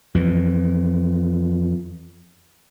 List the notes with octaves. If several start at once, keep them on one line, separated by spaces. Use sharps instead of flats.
F2 E3